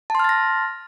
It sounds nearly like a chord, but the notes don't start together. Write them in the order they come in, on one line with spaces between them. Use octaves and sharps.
A5 C6 F6 A6 A#6